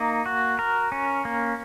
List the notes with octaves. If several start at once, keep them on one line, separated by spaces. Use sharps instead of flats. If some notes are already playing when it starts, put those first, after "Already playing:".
Already playing: A#3 D#4
F#4
A#4
C#4
A#3